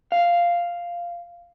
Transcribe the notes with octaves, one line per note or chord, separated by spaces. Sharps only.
F5